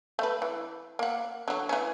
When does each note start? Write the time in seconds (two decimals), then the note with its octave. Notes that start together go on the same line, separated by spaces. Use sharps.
0.19 A3 B4
0.42 E3
0.99 A#3 F#5
1.48 D3 F#3
1.69 E3 A3 C#4